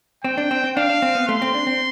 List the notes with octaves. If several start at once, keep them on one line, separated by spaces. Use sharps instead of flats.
C4 G5
D4
C4
C4
D4 F5
D4
C4
B3
A3 C6
C4
D4
C4